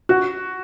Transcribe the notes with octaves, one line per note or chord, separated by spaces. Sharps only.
F#4